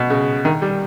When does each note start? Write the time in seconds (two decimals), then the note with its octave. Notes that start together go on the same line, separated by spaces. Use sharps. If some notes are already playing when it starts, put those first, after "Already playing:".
Already playing: B2
0.10 C#3
0.45 D#3
0.62 G3